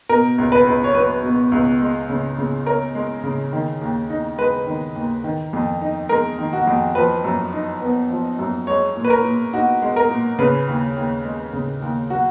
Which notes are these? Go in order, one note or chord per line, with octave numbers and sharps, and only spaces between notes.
B2 A#4
C#2
B4
C#2
C#5
F#3 B4
B2
C#2
G#3
C#3
C#3
C#4 A#4
G#3
C#3
D#3
D#2
D#4
G#3 B4
D#3
D#2
D#3
F2
D#4
G#3 A#4
D#3
F#4
F2
F3 B4
F#2
D#4
B3
F3
F#2
G#3 C#5
A#2
B4
A#4
A#2
D#4 F#4
G#3
A#4
A#2
C#3 B4
D#2
D#2
G#3
C#3
D#2
F#3 F#4